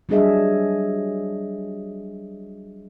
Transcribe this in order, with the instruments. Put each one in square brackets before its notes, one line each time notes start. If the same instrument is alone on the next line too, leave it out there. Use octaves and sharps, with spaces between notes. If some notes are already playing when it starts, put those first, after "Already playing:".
[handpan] F#3 G3 D4 G#4 D#5 E5